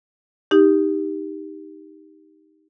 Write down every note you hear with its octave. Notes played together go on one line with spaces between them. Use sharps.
D#4 G4